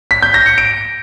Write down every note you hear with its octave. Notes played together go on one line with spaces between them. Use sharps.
B6
G6
A#6
C#7
D7